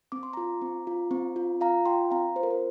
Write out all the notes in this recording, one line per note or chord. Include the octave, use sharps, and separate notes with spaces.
C4 D6
C6
F4 A#5 D6
C4
F4
C4
F4
F4 F5 A#5
F4 G5 C6
C4 F5 A#5
F4 C5
A#4
C5